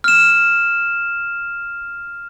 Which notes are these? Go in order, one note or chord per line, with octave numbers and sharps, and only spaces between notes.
F6 E7